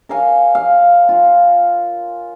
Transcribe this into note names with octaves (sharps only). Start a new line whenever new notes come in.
A#4 C#5 F5 G#5
F5
F4